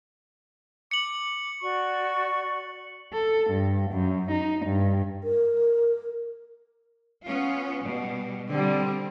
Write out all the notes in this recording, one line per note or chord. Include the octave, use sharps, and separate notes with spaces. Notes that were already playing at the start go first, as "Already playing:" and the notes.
D6 C#7 F#7
F#4 D5 C#6
A4
G2
F#2
D#4
G2
A#4
B3 C#4 F4
B2 G3
D3 G3 C4